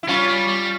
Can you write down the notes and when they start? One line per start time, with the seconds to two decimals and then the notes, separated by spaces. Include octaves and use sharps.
0.03 E4
0.08 G3 C#4 F4
0.28 G3
0.48 G3